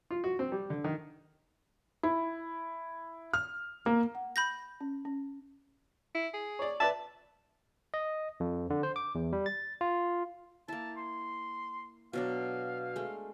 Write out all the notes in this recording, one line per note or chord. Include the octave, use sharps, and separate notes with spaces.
F4
F#4
C4
G3
D3
D#3
E4
F6
A#3
F#5
B5 G6 A#6
C#4
C#4
E4
G#4
C#5 D5
B4 D5 E5 A5
D#5
F2
D3
C5
D6
E2
G3
A6
F4
A#3 E4 A5
C6
B2 F#3 D4 F5
G#3 A3